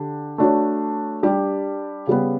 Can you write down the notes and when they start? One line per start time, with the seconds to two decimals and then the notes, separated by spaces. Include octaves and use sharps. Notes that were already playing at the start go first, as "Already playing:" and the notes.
Already playing: D3 D4 G4
0.38 A3 D4 F#4 C#5
1.23 G3 D4 G4 D5
2.07 C#3 G3 B3